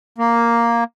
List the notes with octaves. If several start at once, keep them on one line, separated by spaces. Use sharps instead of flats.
A#3